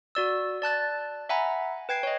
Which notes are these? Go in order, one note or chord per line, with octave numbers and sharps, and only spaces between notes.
F#4 D5 E6
D5 A5 F#6 A6
E5 F#5 G#5 A#5 B5
B4 G5 G#6 C7
C#5 D#5